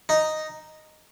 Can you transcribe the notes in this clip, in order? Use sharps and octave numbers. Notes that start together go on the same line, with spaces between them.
D#4